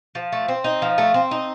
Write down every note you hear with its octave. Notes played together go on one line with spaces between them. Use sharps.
F3
A3
C4
D#4
F3
A3
C4
D#4